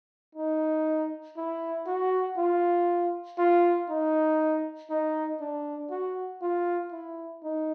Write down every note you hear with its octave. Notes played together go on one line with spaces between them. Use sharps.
D#4
E4
F#4
F4
F4
D#4
D#4
D4
F#4
F4
E4
D#4